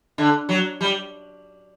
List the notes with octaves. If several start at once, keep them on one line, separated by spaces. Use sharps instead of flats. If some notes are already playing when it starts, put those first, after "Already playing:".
D3
F#3
G3